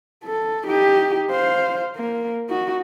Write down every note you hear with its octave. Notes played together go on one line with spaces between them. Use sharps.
A4
D#4 G4
C5 F5
A#3
D#4 F#4